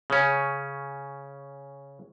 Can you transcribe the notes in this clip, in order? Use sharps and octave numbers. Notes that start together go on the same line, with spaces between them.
C#3 C#4